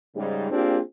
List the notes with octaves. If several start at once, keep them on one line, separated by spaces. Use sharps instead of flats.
G#2 C#3 G3
A#3 C4 D4 F4 G4 G#4